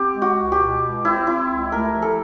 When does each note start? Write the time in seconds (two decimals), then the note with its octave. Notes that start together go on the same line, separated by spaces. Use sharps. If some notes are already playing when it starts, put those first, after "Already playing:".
Already playing: C4 G4
0.14 G#3
0.22 F#4
0.37 C#2
0.52 G4
0.59 B2
0.83 C#2
1.04 C4 E4
1.27 C4 E4
1.50 C#2
1.72 A3 A#4
1.94 F3
2.02 A4